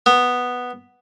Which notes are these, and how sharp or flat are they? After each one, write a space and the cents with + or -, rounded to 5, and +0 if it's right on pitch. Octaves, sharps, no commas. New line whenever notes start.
B3 +0